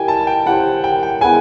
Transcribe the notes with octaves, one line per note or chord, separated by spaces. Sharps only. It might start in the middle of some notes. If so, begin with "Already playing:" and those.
Already playing: E4 G4 A#4 D#5 G5 G#5
A5
G5
E4 G4 C5 F#5
G5
G5
G#3 B3 E4 G#5